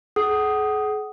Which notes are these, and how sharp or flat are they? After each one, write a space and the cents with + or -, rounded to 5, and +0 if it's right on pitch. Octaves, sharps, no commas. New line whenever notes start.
G#4 +40 F#5 +30 D#6 +0